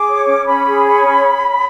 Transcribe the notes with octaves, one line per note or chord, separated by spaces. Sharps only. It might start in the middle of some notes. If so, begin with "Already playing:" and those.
Already playing: G#4 D6
C#5
C#4
C#4 B5
G#4
C#5
C#4